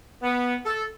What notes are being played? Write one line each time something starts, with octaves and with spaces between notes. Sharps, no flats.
B3
A4